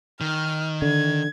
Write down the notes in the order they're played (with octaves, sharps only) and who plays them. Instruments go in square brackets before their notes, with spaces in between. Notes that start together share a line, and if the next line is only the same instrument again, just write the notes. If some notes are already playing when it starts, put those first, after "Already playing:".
[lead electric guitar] D#3 [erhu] F6
[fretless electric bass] D3 [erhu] G#6